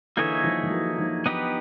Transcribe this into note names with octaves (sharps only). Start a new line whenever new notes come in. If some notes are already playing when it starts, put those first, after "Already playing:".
D3 E3 A#3 D#4 G#4 C#5 E5
D#3 F3
F3
E3 F#3
E3
D#3 F3
B3 D#4 G4 B4